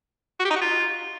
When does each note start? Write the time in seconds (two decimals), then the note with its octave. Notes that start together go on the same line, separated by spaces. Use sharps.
0.40 F#4
0.45 G4
0.51 D#4
0.56 F#4
0.62 F4